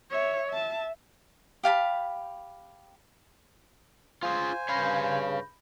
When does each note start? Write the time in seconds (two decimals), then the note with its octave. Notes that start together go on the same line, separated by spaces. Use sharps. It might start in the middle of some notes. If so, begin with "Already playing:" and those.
0.11 C#5 E5
0.50 E5 A5
1.63 G4 F5 A5 B5
4.23 F4 G#4 C5 F5 G#5
4.69 G2 C#3 C#5 F5 B5 G6 A#6